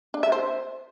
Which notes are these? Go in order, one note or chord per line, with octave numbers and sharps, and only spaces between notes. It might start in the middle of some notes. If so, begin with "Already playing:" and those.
D4
E5
C5